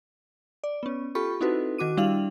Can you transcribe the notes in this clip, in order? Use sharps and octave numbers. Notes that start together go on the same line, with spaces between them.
D5
B3 C#4
F4 G4 A4 B5 C#6
C4 D#4 E4 F#4 A4 B4
D#3 F#4 D6 D#7
G3 D4 E4 F5 F7 F#7